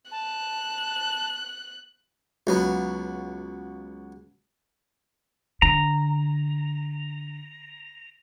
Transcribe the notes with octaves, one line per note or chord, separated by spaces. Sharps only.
A5 F#6
C#2 F#3 B3
D3 A#5